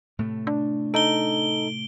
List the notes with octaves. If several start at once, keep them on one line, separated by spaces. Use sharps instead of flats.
A2 C3 A3
D4
D#4 A4 D7 G7